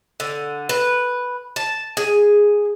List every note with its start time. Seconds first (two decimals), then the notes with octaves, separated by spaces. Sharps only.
0.20 D3
0.69 B4
1.56 A5
1.97 G#4